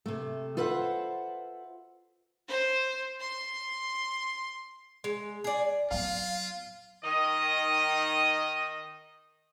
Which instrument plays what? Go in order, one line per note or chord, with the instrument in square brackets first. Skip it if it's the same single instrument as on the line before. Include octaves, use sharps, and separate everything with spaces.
[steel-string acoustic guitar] C3 A3
F4 A4 B4 C5 E5 F#5
[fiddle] C5
C6
[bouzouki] G#3
G#4 D5
[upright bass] F#3 B3 [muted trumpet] F4 [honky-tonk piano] F5
[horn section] D#3 D#5